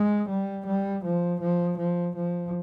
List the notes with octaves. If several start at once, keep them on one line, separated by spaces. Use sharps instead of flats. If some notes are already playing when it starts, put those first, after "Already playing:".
Already playing: G#3
G3
G3
F3
F3
F3
F3